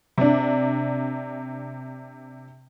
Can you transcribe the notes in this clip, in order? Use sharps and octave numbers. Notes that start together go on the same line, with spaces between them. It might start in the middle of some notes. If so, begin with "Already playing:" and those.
C3 D4